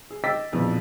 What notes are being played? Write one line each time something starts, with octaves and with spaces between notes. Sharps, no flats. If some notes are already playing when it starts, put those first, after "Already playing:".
G#4
D#5 G5 D6 E6 A6 B6
A#1 F2 B2 E3 F3